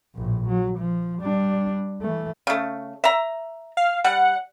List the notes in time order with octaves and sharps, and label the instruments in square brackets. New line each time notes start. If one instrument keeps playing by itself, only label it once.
[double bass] A#1 A2
F#3
F3
G3 D4
E3 A3
[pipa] C#3 A3
E5 A#5
[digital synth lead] F5
[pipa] G3 [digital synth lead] F#5